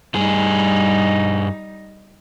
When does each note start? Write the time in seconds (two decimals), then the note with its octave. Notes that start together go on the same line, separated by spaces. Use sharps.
0.15 G2 G3 D#4 G#4